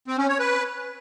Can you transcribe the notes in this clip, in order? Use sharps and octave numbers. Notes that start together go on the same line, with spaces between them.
C4
C#4
C#5
B4